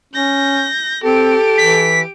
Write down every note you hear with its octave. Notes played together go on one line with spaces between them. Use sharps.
C#4 G6 A#6
C4 G4 A4 D7
E3 B6